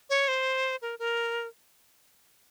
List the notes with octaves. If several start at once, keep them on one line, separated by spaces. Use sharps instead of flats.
C#5
C5
A#4
A#4